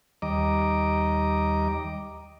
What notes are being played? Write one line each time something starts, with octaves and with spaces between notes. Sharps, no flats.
D#2 G3 D#5 A#5 D6